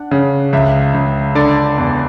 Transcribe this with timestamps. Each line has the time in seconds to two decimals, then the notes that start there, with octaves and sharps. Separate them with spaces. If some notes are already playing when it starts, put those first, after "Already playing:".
Already playing: D4 F#5
0.11 C#3
0.53 C#2 E5
0.94 C#2
1.35 D3 D5
1.78 E2